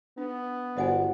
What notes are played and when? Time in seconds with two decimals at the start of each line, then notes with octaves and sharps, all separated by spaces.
0.18 B3 D4
0.77 G1 F#4 C5 D5 D#5 F#5 G#5